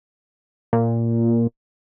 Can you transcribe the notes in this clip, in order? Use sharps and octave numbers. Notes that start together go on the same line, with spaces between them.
A#2